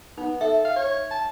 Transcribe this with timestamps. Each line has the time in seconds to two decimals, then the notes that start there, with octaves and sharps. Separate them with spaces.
0.18 B3 D#4
0.41 A4 E5
0.65 F5
0.76 C#5
1.11 A5